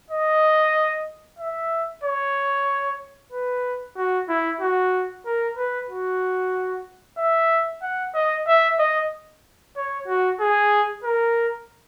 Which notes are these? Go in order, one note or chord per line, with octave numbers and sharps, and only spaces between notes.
D#5
E5
C#5
B4
F#4
E4
F#4
A#4
B4
F#4
E5
F#5
D#5
E5
D#5
C#5
F#4
G#4
A#4